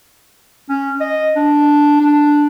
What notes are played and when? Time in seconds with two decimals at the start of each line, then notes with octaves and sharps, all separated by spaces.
0.69 C#4
1.01 D#5
1.36 D4
2.00 D4